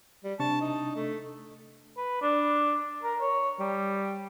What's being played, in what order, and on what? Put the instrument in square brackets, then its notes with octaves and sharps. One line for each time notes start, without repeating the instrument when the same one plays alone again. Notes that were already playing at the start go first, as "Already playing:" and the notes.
[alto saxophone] G3
[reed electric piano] C3 D4 C#6 [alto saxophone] A5
[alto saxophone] D#4
A3
[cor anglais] B4
D4
A#4
C#5
G3